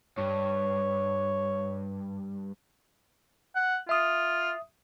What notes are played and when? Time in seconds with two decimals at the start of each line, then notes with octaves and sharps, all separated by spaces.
0.18 G2 C#5
3.55 F#5
3.89 F4 E5 D#6